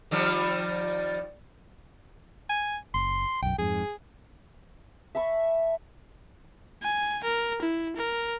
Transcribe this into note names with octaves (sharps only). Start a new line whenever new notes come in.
D#3 F3 G3
G#5
F#1 C6
B1 F#2 G5
F2 G#2 G#4
E5 A5 B5 C#6
G#5
A#4
E4
A#4